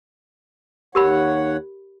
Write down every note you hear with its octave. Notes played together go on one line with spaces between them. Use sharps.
D#2 G4 A#4 C#5 F#5 B5